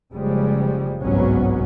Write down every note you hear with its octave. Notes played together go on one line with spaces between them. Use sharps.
F#1 C#3 F3 G3 G#3
G1 C2 G#2 F#3 B3 C#4